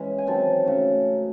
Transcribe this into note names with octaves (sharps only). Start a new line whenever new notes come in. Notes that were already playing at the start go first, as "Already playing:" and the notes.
Already playing: E3 G#3 C#4
G#5
D#3 F#3 C4 A5
C#3 F#3 A3 C#4